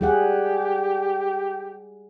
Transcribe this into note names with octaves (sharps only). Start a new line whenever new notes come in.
G3 G4 G#4 F#5